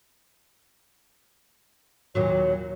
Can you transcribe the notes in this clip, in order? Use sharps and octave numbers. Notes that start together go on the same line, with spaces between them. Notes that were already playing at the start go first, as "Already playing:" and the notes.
D#2 A#2 F#3 C#5